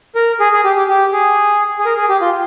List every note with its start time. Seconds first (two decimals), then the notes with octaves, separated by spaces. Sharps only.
0.15 A#4
0.40 G#4
0.52 G#4
0.64 G4
0.76 G4
0.88 G4
1.12 G#4
1.79 G#4
1.85 A#4
1.97 G#4
2.09 G4
2.21 F4